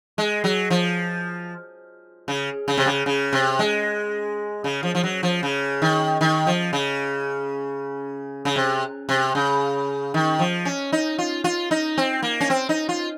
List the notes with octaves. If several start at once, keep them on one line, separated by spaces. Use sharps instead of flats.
G#3
F#3
F3
C#3
C#3
C3
C#3
C#3
C3
G#3
C#3
F3
F3
F#3
F3
C#3
D#3
D#3
F3
C#3
C#3
C3
C3
C#3
D#3
F3
C#4
D#4
F4
F4
D#4
C4
A#3
C#4
C4
D#4
F4